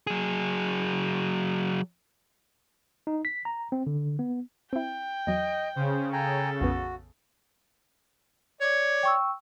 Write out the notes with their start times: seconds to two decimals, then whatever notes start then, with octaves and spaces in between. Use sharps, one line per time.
0.07 F#3 G#4
3.07 D#4
3.25 B6
3.45 A#5
3.72 C4
3.87 D3
4.19 B3
4.73 C4 E4 G5
5.27 E2 F#3 D#5
5.76 C#3 C5
6.13 A4 G5 G#5 A#5
6.61 A#1 F2 B3 F#4
8.61 C#5 D5
9.03 G5 C#6 E6